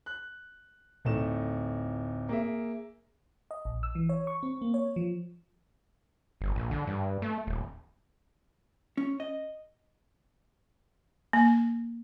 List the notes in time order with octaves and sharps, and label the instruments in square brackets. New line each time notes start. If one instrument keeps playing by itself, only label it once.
[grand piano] F#6
D1 A3 D#4 E7
A#3 G#4 E5
[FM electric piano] D#5
A#1
E6
E3
C#5
C#6
C4
A#3
C#5
F3
[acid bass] G1
A#1
D3
G2
A3
D#1
[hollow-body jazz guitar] C#4
D#5
[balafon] A#3